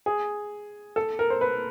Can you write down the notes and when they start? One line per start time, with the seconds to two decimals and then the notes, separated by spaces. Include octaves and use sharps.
0.06 G#4
0.96 A4
1.19 A#4
1.30 C5
1.41 B4